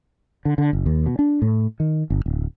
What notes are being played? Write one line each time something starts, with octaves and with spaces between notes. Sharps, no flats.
D3
D3
F#1
D#2
B2
D4
A2
D#3
G1
D1